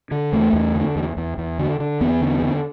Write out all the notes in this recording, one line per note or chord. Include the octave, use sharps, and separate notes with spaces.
D3
E2 A3
E2
D3
E2
E2
E2
D3
D3
E2 B3
D3
D3